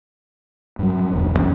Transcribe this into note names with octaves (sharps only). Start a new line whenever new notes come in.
G2 F#3
E1 A#1 E2 D3
F#2 B2 E3 C#4